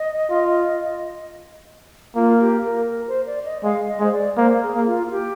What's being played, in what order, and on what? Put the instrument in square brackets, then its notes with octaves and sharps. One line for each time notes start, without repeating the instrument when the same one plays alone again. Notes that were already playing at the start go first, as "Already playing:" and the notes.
Already playing: [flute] D#5
[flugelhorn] F4
[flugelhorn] A#3 [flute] F4
[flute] G4
A#4
A#4
C5
D5
D#5
[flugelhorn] G#3 [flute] F5
[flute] D#5
[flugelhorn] G#3 [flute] C5
[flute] D5
[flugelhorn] A#3 [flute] C5
[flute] G#4
[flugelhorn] A#3
[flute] F4
F4
G4